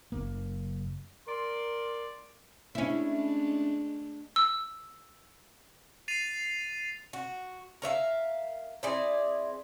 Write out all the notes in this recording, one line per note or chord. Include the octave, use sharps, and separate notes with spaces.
F#1 A#3
A#4 D5 C6
G#3 A3 C#4 D4 E4
E6
A6 C7 D#7 F7
F#4
A#4 C#5 E5 F5
C4 E4 G#4 D5